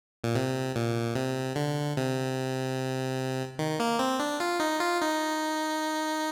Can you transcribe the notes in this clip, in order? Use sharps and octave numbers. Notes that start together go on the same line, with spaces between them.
A#2
C3
A#2
C3
D3
C3
D#3
A#3
C4
D4
F4
D#4
F4
D#4